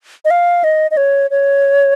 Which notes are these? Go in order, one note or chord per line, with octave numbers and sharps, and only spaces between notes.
D#5
F5
D#5
D#5
C#5
C#5